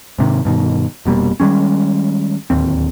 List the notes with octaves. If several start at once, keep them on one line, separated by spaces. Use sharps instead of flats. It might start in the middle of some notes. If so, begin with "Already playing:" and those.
G#2 C3 D#3
G2 B2 D#3
F1 B2 G3 A#3
D#3 G3 G#3 C#4
D1 D#2 C4